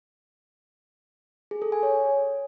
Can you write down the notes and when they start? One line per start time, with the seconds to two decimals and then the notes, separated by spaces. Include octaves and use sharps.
1.51 G#4
1.62 A4
1.72 G#5
1.83 C#5